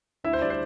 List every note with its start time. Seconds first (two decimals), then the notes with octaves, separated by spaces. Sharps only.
0.24 D2 E4 E5
0.33 C5
0.41 D3 G3 D4 D5
0.50 C5